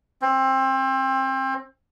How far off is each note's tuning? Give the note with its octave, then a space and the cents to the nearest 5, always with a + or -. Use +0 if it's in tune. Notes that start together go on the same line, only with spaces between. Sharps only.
C4 +25